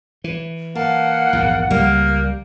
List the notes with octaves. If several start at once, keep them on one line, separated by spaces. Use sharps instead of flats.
E3
A#3 F#5 A5
A#1 E2 G#2
C#2 G3 A#3